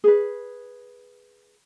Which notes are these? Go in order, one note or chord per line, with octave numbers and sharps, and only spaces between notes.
G#4 B4